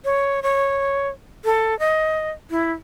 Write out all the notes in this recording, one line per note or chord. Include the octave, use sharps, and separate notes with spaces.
C#5
C#5
A4
D#5
E4